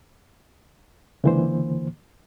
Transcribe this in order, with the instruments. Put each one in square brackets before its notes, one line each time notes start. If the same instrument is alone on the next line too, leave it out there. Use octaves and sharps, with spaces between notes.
[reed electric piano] C#2 D3 E3 A#3 C5